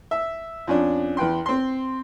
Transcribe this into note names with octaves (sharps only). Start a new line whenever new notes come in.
E5
F2 C#4 D4
E2 B4 G5 C6
C4 C6